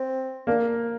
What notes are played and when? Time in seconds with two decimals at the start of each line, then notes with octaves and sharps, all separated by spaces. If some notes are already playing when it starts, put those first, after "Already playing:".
Already playing: C4
0.47 A#3 D4